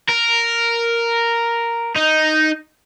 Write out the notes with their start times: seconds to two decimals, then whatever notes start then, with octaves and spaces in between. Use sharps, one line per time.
0.09 A#4
1.96 D#4